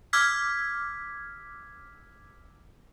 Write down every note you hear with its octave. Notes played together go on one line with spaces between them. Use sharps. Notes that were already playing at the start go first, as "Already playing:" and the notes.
D6 E6 F6 G#6 B6